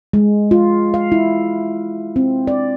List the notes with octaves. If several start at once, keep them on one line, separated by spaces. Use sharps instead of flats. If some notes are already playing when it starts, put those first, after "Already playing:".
G#3
F4
F5
E4
C4
D5